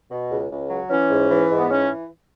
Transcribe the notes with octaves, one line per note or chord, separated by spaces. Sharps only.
B2
C#2
C#2
F#3
E3 C#4
G#2
E3
G#2
B3
E3 C#4